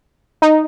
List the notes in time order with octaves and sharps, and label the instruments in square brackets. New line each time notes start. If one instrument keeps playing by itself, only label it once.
[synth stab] D#4